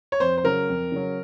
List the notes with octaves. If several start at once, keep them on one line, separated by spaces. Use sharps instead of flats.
C#5
F2 C5
C5
C#3 F#3 A#4
F2
C#3 F#3